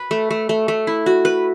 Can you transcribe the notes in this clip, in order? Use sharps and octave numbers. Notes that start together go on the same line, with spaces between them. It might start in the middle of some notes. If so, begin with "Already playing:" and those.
Already playing: B4
A3
A3
A3
A3
E4
F#4
B4